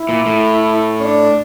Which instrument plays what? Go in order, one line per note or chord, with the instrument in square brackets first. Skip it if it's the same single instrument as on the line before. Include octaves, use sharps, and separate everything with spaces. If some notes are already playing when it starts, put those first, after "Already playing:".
Already playing: [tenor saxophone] E4
[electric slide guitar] A#2
A2
[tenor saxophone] C#4
D4